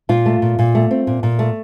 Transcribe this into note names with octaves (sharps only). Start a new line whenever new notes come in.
A#2 F4
A3
A#2
A#2
A3
C4
A#2
A#2
A3